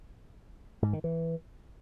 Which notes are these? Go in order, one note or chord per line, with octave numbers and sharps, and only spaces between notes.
G#2
D#3
E3